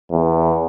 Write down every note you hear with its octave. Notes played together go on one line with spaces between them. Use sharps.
E2